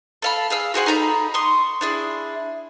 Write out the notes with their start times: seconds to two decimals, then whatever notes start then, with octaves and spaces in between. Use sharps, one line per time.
0.22 A4 F5 B5
0.50 G#4 F5 E6
0.74 F#4 G#4 C5 F#5
0.86 D#4 A4 A#5 B5
1.34 C6 C#6 D#6
1.81 D4 E4 G#4